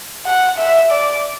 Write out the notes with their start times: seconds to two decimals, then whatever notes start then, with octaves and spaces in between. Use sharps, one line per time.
0.26 F#5
0.58 E5
0.91 D5